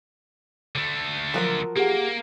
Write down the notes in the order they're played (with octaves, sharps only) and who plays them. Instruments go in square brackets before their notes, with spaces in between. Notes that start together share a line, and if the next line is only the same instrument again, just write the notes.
[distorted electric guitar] D3 A3
[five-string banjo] F3 F#3 A#4
[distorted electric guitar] A#3 [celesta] G4 G#4 F#5